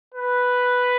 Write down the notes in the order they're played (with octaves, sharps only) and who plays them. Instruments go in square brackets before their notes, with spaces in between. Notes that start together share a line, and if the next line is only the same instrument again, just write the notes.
[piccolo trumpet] B4